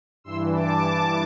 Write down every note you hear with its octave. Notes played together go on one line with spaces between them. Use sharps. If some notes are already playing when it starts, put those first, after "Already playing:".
G2 E3 C6 E6
A5 D6
A5 D6